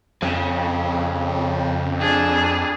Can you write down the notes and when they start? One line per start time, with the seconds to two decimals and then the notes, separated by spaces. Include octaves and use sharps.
0.22 F2 C#3
2.00 D4 G#4